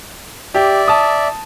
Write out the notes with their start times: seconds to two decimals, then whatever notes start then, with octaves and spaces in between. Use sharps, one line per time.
0.55 G4 D5 E5
0.88 A5 D#6